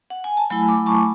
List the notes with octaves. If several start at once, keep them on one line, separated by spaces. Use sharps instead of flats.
F#5
G#5
A5
F#3 A3 E4 G#5 B5
B5 D6
A5 C#6